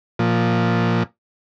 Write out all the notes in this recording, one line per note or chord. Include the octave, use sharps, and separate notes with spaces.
A#2 F3